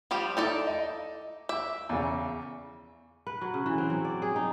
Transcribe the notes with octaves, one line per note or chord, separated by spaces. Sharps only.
F3 G3 G4
D#4 E4 A4 D5
D#5
E5 D6
E2 C#3
B4
F#3
C#3
E3
C4
F#3
D5
G#4
D#4